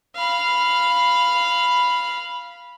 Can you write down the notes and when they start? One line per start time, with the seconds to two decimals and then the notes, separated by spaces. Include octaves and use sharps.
0.16 F5 B5